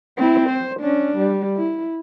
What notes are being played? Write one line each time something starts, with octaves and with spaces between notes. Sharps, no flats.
C4 E4
C5
C#4 D4
G3
E4